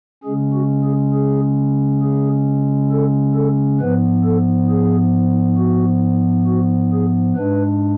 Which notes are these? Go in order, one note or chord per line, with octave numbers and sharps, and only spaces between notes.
C#3 G#3 C#4 G#4
F#4
G#4
G#4
G#4
A4
A4
G#2 F3 B3 B4
A4
G#4
F#4
F#4
G#4
G#2 G#3 D4 B4